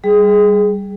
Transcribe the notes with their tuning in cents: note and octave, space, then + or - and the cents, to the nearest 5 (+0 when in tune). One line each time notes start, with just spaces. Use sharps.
G3 +0 G#4 +5